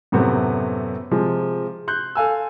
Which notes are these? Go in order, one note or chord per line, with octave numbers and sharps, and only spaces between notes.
F#2 A2 C3 A3 B3 C4
C3 F3 G#3
C6 F#6 G6
A4 F5 G#5 E6